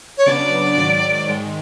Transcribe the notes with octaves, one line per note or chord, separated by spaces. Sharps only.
C#5
C#3 F#3 B3 D4 D5
G#2 D#3 F#3
G#2 D#3 G#3